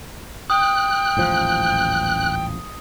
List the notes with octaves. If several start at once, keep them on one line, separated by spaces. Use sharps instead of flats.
G5 D#6 F#6
D#1 A1 F3